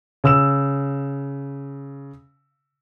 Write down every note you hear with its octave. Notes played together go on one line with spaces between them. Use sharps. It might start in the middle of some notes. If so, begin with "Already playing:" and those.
C#3 E6 E7